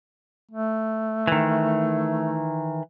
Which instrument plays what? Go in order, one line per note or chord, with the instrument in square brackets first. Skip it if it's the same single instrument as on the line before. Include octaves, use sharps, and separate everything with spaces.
[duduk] A3
[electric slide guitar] D#3 E3